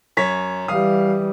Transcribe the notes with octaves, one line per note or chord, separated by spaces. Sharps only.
F#2 C#5 B6
E3 G3 F5 D#6